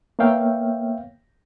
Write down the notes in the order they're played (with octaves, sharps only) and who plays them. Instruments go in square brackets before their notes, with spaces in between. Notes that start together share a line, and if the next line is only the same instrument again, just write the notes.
[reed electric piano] A#3 B3 C#5 E5 F5 G5